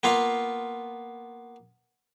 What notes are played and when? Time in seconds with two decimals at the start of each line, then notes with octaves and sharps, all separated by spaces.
0.03 A#3 B3 F4 F5